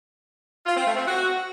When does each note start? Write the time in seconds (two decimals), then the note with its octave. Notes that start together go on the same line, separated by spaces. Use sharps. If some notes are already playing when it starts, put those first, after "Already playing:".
0.66 F4
0.76 C4
0.87 A3
0.97 C4
1.07 F#4